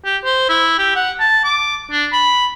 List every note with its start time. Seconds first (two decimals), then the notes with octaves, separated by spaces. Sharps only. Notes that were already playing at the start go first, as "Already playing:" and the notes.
0.05 G4
0.24 C5
0.49 E4
0.78 G4
0.95 F#5
1.20 A5
1.44 D6
1.91 D4
2.13 B5